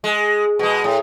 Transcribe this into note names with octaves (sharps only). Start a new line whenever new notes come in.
G#3
B2 G#3
A2